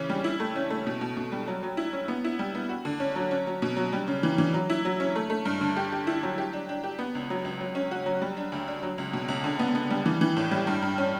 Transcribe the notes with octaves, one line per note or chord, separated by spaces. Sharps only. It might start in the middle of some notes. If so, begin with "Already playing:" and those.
Already playing: C#3 E3 C#4
G3
E4
A3
C#4
A3
B2
B2
B2
G3
F#3
F#3
E4
C#4
B3
E4
G3
B3
F#4
D3
C#4
F#3
C#4
F#3
B2
F#3
G3
C#3
E3
E3
F#3
E4
F#3
C#4
A3
A3
G2
D3
G4
G4
E4
F#3
G4
D4
D4
G4
B3
C#2
F#3
C#2
F#3
C#4
F#4
F#3
G3
D4
D2
D4
F#3
C#2
B2
C#2
D3
B3
B3
G3
E3
E3
A2
G3
G2
G2
C#4